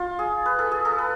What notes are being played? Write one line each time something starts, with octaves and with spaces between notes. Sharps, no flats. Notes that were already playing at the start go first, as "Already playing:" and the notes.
Already playing: F4
G#4
B4
A4
G#4
A4
B4